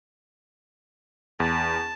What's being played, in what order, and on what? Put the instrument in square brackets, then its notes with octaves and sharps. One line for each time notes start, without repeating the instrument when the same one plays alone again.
[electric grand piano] E2 [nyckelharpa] A5